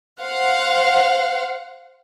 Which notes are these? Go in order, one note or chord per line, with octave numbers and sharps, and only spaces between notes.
C5 F5 F#5